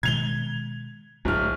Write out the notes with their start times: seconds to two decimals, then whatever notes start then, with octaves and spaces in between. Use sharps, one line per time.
0.03 B2 D#3 G#3 G#6 F7 G7
1.25 D1 B1 D4 F6